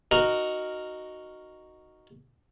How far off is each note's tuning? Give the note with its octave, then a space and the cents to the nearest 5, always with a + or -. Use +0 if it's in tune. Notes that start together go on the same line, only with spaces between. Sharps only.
D#4 -5 F#4 +0 A#4 +0